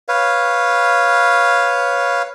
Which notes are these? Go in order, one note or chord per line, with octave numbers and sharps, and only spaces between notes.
B4 C#5 F5